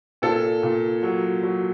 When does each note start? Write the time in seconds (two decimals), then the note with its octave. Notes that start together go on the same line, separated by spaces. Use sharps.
0.22 A#2 A4
0.63 A#2
1.03 F#3
1.43 F#3